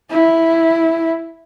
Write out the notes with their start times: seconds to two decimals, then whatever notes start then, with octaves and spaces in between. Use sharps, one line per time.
0.10 E4